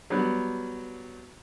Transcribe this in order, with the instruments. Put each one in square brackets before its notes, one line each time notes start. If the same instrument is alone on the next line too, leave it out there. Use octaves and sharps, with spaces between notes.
[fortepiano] F#3 G3 B3